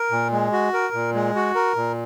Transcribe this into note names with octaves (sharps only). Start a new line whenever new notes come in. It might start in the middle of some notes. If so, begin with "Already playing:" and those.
Already playing: A#4
A#2
G#3
F#4
A#4
A#2
G#3
F#4
A#4
A#2